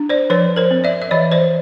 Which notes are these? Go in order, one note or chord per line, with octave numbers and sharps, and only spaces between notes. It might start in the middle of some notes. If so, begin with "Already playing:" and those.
Already playing: D4
C5 D5
F3 B4 C#5
A#4 C5
C4
D5 E5
E5
E3 C#5 D#5
C5 D5